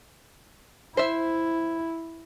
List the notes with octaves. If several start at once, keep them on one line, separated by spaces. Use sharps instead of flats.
E4 C5 E5